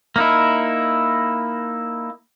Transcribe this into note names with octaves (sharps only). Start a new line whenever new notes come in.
A#3 D#4 E4